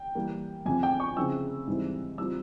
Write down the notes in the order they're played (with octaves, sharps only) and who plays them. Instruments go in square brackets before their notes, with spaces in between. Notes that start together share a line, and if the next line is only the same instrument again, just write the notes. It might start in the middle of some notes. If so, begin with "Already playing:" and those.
Already playing: [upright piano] G5
E3 G3 A#3
F2 C3 F3 G#5
G5
C#6
C#3 F3 C4 E4 E6
G#2 E3 G3 C4 E4
E3 G3 C4 F4 E6